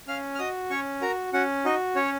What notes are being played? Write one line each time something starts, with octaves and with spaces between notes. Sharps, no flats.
C#4 F5 F6
F6
F#4 D#5 D#6
C#4 C#5 C#6
F#4 A#4 A#5
C#4 F#4 F#5
D#4 F#4 D#5
C#4 C#5